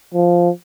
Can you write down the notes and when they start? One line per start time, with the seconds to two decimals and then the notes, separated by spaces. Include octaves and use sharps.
0.14 F3